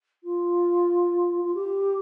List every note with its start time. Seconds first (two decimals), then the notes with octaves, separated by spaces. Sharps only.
0.24 F4
1.44 F4
1.55 G4